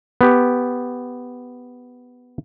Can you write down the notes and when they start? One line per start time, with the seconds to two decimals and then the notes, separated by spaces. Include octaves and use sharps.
0.21 B3 G4